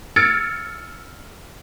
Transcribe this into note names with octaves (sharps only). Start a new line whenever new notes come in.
E6 F6 G#6 A6 C#7 D7